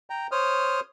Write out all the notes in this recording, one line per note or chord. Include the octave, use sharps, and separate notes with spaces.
G5 A#5
C5 C#5 D#6 F6